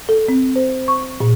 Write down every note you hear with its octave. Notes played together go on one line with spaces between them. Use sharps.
A4
C4
C5
C#6
A#2